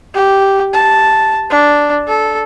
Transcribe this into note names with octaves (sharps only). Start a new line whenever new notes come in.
G4
A5
D4
A4